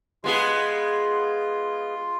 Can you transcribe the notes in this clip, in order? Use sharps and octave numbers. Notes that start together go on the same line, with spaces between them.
G#3 B3 F4 G#4